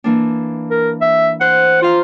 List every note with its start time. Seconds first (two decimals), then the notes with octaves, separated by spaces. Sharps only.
0.04 E3 A#3 D4
0.70 A#4
1.01 E5
1.41 C5 F#5
1.82 F4 C5 F5 A#5